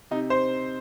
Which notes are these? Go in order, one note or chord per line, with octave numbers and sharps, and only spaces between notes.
C3 D#4
C5